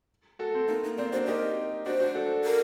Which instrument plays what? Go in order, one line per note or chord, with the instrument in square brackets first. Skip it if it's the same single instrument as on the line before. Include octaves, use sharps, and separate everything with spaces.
[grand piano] F#4 A4
C4
[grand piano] A#3 [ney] D#4
[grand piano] A#3 [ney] D#4
[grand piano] C4 [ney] D5
[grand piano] D4 F#4 [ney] C5
[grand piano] D#4 G4 [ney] A#4
[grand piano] D4 F#4 [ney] C5
[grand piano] D4 F#4
F#4 A4
[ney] A#4